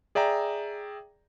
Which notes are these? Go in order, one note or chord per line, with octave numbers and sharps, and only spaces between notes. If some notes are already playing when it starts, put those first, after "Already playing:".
G#4 D5 E5 G5 A#5